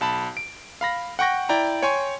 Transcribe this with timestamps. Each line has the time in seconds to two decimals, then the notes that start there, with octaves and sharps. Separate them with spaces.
0.01 B1 A5 B5
0.37 D7
0.81 F5 B5 A#6
1.19 F#5 G5 C#6 A#6
1.49 E4 D5 G5 A#5
1.83 C#5 G5 G#5 C6 C#6